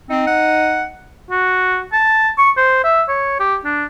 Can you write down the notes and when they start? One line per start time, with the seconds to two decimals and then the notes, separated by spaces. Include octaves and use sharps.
0.10 C4 D#4
0.27 F#5
1.31 F#4
1.93 A5
2.38 C#6
2.57 C5
2.84 E5
3.08 C#5
3.40 G4
3.65 D4